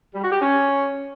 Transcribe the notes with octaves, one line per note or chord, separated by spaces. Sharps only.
G3
F#4
G4
C#4